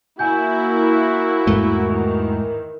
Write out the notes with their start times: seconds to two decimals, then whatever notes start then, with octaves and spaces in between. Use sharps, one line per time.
0.19 A#3 E4 F#4 G#5 G6
1.47 E2 G#2 A3
1.89 D#3 E3